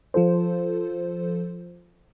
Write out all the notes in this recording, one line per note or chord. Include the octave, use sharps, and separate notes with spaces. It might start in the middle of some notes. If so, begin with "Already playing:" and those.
F3 F4 A4 C5